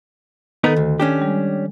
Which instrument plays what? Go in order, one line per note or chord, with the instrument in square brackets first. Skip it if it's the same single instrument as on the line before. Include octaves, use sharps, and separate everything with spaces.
[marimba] D#3 A4 [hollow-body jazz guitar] B3 D#4 A#4
[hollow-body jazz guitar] D2
C#4 D4 G4
[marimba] G3 G#3